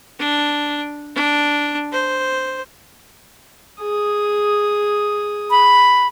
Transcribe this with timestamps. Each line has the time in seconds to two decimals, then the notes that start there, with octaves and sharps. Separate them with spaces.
0.19 D4
1.15 D4
1.92 C5
3.81 G#4 D#6
5.51 B5